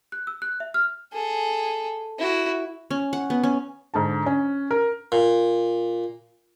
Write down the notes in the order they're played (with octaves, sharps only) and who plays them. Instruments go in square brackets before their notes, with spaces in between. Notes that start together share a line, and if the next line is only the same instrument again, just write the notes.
[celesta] F#6
E6
F#6
E5
F6
[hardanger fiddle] G#4 A4
E4 F#4
[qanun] C#4
F#5
B3
C#4
[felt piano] G#2 D3 A5
C#4
A#4
[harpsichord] A#2